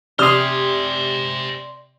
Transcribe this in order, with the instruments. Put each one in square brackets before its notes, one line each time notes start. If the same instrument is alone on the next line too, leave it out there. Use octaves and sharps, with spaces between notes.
[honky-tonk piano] C3 [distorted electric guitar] C5 G#5 [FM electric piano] D5 C6 [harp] D#6 F6